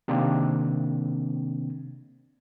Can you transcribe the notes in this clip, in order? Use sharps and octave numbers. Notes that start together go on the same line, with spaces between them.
C3 D#3 A#3 C4 D4